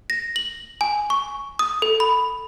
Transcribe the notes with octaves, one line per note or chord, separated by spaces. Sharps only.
A#6
F#7
G#5
C#6
D#6
A4
B5